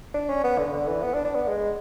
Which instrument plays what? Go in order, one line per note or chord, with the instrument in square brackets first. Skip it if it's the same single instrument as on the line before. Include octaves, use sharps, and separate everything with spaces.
[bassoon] D4
C#4
B3
D3
D3
E3
B3
D4
D4
B3
G#3